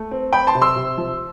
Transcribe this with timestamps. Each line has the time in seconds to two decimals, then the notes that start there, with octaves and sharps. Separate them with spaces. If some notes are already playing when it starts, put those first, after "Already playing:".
Already playing: A3
0.11 C4
0.33 C4 G5 B5
0.47 A5 C6
0.55 C3
0.61 C6 E6
0.76 C3
0.98 F3